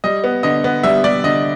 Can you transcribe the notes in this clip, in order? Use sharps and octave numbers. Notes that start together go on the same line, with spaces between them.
G3 D#5
B3
D3 D#5
B3
G3 E5
G3 D5
D3 D#5